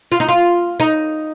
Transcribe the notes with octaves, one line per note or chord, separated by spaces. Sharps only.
F4
D#4
F4
D#4